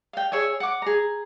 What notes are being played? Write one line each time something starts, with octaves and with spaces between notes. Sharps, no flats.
F5 G5
G#4 C#5 E5 G#5
F#5 D6
G#4 A#5